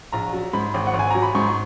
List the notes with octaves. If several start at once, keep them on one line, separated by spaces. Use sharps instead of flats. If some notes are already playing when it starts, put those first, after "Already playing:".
A#1 A#5
F#3
G#2 B5
G#1
F#5
G#1
G#5
F#3 A#5
B5
G#2 C#6